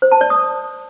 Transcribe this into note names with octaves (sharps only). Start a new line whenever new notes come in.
C5
A5
D5
D#6